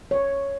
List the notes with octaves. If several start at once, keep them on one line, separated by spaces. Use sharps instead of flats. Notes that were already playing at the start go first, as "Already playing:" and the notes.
C#5